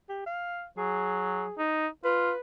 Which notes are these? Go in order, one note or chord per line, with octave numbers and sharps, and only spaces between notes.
G4
F5
F#3 G#4
D#4
F4 B4